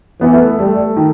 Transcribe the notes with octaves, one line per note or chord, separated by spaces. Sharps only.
E3 B3
A3
G3 A3
D#3